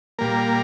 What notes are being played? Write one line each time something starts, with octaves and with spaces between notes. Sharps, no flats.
A#2 G3 A#3 A#4